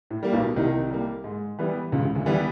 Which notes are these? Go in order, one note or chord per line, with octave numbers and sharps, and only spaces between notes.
A2
G3 A#3
B1 B2
C2 C3 D#3
G3 A#3
G#2
E3 G3 B3
C#2 G#2 C#3
C#3
D2 D3
E3 G3 B3